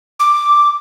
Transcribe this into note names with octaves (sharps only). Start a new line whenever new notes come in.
D6